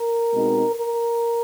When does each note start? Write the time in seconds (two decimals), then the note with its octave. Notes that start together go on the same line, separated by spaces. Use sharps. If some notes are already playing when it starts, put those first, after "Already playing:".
Already playing: A#4
0.33 B2 G#3 C4 D#4
0.75 A#4